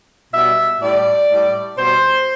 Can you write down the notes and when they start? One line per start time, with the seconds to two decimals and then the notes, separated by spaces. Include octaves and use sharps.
0.33 B2 G3 E5
0.81 A2 G3 D5
1.29 A2 G3
1.77 B2 G3 C5